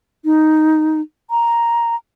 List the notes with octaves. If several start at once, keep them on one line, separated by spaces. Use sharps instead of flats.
D#4
A#5